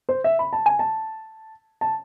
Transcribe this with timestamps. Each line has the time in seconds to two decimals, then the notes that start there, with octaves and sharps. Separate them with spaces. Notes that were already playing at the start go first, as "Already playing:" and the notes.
0.09 C5
0.24 E5
0.39 B5
0.53 A5
0.66 G#5
0.79 A5
1.81 A5